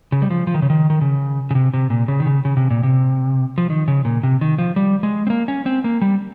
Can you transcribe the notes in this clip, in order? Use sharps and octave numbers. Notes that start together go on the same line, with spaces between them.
C#3
G3
F3
F3
D#3
C#3
D#3
D#3
C#3
C#3
C3
C3
A#2
C#3
D#3
C#3
C#3
C3
A#2
C3
F3
D#3
C#3
A#2
C3
D#3
F3
G3
G#3
C4
A#3
C#4
C4
A#3
G3